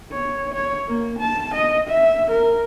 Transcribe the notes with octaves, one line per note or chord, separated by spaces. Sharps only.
C#5
C#5
A#3
A5
D#5
E5
A#4